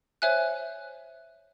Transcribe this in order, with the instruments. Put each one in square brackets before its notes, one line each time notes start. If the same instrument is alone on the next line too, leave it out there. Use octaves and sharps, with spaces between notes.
[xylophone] C5 C#5 E5 G#5 F#6